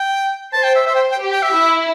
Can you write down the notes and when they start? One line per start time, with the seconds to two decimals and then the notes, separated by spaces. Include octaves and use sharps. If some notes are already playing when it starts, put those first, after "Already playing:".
Already playing: G5
0.53 C5 A5
0.64 G5
0.75 E5
0.86 C5 E5
0.95 G5
1.11 G5
1.19 G4
1.31 G5
1.42 E5
1.53 E4